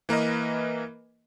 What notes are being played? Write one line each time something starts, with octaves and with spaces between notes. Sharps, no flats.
E3 A#3 A#4 B4 D#5